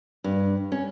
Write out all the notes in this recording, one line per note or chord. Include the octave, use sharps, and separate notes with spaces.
G2
C#4